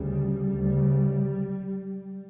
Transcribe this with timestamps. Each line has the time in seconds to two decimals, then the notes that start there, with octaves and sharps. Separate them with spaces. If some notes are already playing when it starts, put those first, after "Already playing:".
Already playing: D2 C#3 G3
0.52 D2 C#3